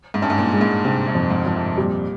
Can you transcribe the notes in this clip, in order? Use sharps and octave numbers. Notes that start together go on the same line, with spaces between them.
G#2
G2 C#4
G#2
A#2
G#3
G#2
G2 C3
G2
F2
G#2
F2
C3
A#2 G3